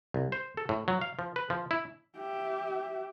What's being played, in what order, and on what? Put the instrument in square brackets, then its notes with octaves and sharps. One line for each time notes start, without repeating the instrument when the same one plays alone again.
[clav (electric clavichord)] C2
C5
A4
A2
F#3
F5
F3
B4
F3
E4
[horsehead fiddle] G4 E5